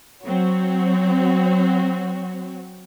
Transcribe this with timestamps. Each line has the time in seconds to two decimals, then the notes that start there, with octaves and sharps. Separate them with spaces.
0.23 F#3 C4 F#4 C#5